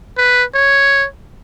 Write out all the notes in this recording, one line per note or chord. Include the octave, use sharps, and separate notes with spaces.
B4
C#5